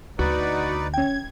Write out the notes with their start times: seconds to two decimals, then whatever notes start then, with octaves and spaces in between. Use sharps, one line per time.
0.19 D2 D#4 F#4 B4 D5
0.94 C#4 G5 G#6